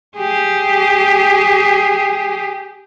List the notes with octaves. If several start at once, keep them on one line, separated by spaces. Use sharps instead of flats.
G4 G#4